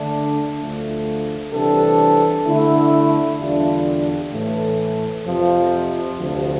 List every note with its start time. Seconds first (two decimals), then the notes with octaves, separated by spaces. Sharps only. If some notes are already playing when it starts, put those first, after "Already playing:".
Already playing: D3 A3 D4
0.58 D2 D3 F3 A3
1.51 C3 E3 G3 D4 A4
2.44 D3 A3 E4
3.37 E2 D3 G3 D4 F4
4.31 A2 E3 A3
5.24 F2 C3 F3
6.17 D2 C3 F3